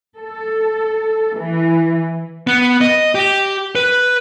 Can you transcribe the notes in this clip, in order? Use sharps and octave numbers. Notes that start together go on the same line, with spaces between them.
A4
E3
B3
D#5
G4
B4